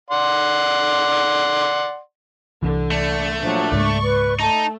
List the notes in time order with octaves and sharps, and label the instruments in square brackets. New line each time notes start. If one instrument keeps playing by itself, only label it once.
[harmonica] D5 F#5 C6
[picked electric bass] C2 E3 [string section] D3
[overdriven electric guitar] A3 [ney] D5
[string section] A#2 F3 F#3 [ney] D4
[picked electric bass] C#2 G#2 G#3 [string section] D5 C#6
[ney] B4
[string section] A3 [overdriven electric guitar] D#4 [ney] A5